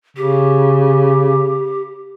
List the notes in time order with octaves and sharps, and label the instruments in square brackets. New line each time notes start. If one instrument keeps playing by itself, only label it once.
[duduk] C#3 [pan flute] G4